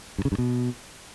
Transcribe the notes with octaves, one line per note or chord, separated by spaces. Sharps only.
G2
C#3
G2
B2